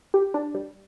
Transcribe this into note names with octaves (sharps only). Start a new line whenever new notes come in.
G4
D4
G3